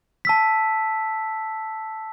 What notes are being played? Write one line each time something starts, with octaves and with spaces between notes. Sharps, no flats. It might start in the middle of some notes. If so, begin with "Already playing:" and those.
A5 E6 B6